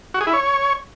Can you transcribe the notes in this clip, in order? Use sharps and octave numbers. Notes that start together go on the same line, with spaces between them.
F#4
G#4
E4
C#5